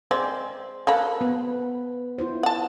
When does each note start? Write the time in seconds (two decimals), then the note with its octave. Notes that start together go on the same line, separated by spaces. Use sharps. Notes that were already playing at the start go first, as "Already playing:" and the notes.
0.11 G#3 C4 C5 D5
0.87 A#3 A4 F#5 B5
1.21 B3 B4
2.18 E4 F4 C5
2.43 F#5 A5